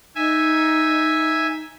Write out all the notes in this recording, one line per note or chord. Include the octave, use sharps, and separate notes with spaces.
D#4 E5 G#5